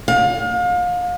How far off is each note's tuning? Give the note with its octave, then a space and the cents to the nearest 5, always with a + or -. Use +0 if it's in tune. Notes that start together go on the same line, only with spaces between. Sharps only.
F5 +35